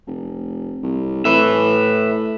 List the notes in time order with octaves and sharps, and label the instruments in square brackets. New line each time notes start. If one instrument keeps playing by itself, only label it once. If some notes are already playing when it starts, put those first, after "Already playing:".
[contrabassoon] F1
C2
[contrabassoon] A2 [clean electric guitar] B4 E5